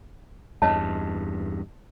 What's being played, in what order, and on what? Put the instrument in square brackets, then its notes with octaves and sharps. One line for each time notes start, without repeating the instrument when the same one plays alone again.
[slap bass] E2 G2 [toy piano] C#5 D#5 A5